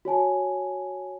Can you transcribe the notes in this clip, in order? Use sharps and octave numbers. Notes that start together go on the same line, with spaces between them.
F#4 C#5 G#5 A5